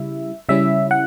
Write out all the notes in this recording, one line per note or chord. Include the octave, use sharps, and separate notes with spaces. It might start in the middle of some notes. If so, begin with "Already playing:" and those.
Already playing: C#3 G3 E4 E5
C#3 G3 C#4 E4 E5
F#5